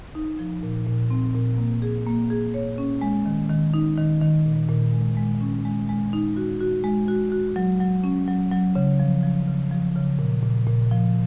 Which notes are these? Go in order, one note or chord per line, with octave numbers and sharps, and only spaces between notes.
D#4
F3
A#2
A#2
C4
A#2
A#3
G#4
A#3
G#4
C#5
C#4
G#3
D#3
D#3
D#4
D#3
D#3
A#2
A#2
G#3
G#3
C#4
G#3
G#3
D#4
F#4
F#4
G#3
F#4
F#4
F#3
F#3
C#4
F#3
F#3
C#3
F3
F3
C#3
F3
C#3
A#2
A#2
A#2
F3